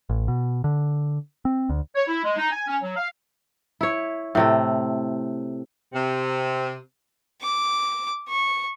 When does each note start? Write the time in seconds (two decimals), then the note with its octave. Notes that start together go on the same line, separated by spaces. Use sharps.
0.10 A1
0.28 B2
0.64 D3
1.45 C4
1.69 D2
1.95 C#5
2.07 E4
2.24 G#3
2.37 D#4
2.51 G#5
2.67 C#4
2.82 F#3
2.96 F5
3.81 E4 C#5
4.35 A2 C3 A3
5.92 C3
7.42 D6
8.29 C#6